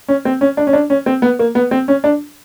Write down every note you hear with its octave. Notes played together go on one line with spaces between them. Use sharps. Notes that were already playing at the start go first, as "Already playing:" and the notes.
C#4
C4
C#4
D4
C#4
D4
C#4
C4
B3
A#3
B3
C4
C#4
D4